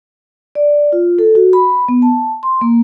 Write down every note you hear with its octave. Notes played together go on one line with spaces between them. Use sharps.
D5
F4
A4
F#4
B5
B3
A5
C6
A#3